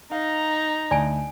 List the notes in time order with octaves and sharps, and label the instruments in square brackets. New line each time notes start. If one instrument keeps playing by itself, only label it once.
[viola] D#4 [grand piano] F5 [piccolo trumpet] A#5
[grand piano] D2 D7 [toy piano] D5 G#5 A5